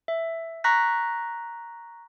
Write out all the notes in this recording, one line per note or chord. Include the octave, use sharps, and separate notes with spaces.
E5
A#5 C#6 F#6 A#6 B6